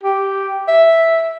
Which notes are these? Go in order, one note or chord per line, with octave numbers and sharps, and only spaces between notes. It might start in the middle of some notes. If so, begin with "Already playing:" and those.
G4
E5